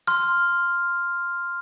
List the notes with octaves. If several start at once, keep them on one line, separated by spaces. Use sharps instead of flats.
C6 F6